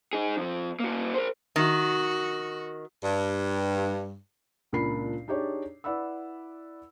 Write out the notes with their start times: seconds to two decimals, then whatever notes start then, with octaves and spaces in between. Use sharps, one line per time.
0.13 D#4 G#4
0.37 F2 F3
0.80 A#3 F#4
1.14 A#4 C5
1.56 D#3 F#4
3.04 G2
4.72 C#2 A#2 D4 A#4 B5 C7
5.28 D4 D#4 G4 G#4 C#5 D5
5.84 E4 B4 D5 F#5 B5 E6